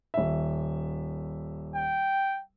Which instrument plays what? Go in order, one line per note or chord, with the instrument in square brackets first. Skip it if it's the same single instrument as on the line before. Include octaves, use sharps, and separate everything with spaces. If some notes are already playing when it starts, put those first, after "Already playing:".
[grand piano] D#1 E5
[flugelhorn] G5